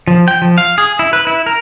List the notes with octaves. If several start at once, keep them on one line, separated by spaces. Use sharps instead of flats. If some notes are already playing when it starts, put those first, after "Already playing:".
F3
G5
F3
F5
G#4
E4
B4
E4
A#4